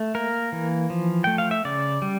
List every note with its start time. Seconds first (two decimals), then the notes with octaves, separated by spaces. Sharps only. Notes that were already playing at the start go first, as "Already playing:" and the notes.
Already playing: A3
0.15 A#3 A#4
0.52 E3
0.90 F3
1.24 A3 G5
1.38 F5
1.51 E5
1.65 C#3 D5
2.02 G3